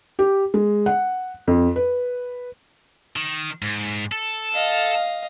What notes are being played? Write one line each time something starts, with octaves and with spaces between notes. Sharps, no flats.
G4
G#3
F#5
F2
B4
D#3
G#2
A4
D#5 F5